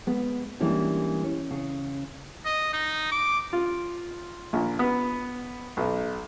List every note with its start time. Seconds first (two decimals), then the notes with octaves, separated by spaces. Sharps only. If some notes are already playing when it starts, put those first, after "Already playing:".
0.07 G#3 B3
0.60 E3 G3 G#3 A#3 C#4 D4
1.24 C#4
1.51 C#3
2.45 D#5
2.73 D#4
3.12 D6
3.53 F4
4.53 A#1
4.79 B3
5.77 B1